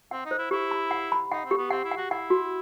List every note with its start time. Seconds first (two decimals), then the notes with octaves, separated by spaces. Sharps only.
0.11 C4 F#5
0.25 D#4
0.31 C5
0.38 E4
0.51 E4 G4
0.71 B5
0.91 F#5
1.12 B5
1.32 D#4 F#5
1.45 C4
1.51 G4
1.58 B3
1.71 C4 F#5
1.84 E4
1.91 F#5
1.97 F#4
2.10 E4 F#5
2.30 F#4